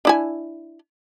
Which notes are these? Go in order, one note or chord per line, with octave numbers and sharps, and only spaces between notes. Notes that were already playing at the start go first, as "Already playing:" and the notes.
D4 E4 G#5